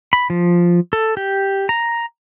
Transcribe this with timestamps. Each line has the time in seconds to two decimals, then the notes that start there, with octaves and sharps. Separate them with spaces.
0.13 B5
0.30 F3
0.93 A4
1.17 G4
1.69 A#5